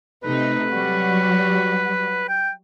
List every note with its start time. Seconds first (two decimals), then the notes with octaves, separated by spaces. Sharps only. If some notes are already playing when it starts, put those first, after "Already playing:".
0.24 C3 A3 D#4 B4
0.71 F#3 G3 F#4
2.28 G5